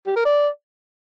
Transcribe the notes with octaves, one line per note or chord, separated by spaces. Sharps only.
G4
A#4
D5